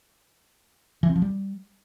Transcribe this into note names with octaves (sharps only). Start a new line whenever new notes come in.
E3
C4
F3
G3